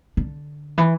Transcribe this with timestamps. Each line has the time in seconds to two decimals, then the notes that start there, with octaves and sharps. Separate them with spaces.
0.17 D3
0.78 E3